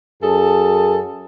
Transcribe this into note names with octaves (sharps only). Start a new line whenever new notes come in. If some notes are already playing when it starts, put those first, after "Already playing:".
F#2 G#4 A4 A5